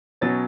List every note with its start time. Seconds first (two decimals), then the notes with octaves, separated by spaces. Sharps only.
0.21 B2 F#3 C#4 A6